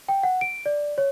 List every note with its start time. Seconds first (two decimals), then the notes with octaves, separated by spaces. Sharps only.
0.08 G5
0.23 F#5
0.41 D7
0.66 D5
0.98 C#5